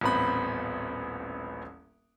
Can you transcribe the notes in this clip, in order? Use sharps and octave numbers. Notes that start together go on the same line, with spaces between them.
D#1 A1 B3 C4 B5